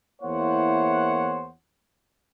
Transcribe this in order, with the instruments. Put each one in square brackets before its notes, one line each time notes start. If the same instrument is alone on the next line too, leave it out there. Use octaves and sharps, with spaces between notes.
[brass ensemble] E2 A#3 E4 C5 C#5 F#5